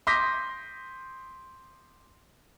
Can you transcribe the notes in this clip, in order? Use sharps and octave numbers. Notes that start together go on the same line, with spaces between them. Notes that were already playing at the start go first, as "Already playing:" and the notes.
C6 D6 D#6 G6 A#6 B6